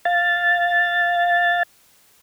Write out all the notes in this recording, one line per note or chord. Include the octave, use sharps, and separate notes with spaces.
F5 A6